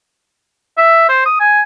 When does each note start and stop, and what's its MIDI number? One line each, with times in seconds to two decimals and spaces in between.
0.78 1.04 76
1.09 1.22 72
1.25 1.39 87
1.40 1.61 80